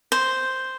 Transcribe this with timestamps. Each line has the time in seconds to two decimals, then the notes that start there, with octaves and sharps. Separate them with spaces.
0.12 C5